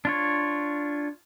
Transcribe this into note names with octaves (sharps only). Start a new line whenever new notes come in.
D4 F4 C#5